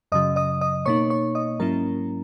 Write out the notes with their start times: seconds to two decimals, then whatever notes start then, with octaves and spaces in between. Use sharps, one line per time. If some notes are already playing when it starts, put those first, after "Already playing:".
0.12 F#2 C#3 F#3 D#5 D#6
0.36 D#5 D#6
0.61 D#5 D#6
0.86 B2 A#3 D#4 C#5 C#6
1.10 C#5 C#6
1.35 D#5 D#6
1.59 G#2 F#3 A#3 C#4 E4 A#4 A#5